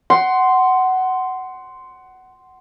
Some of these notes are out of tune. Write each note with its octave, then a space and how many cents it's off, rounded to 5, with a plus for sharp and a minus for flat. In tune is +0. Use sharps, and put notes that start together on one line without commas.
F#5 +15 C6 -5